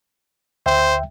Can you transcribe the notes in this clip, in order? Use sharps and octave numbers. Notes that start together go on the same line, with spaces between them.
D2 C5 E5 G5